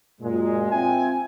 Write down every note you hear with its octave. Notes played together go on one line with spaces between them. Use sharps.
F#2 A#2 G#3
C4 F4 E5 G5 G#5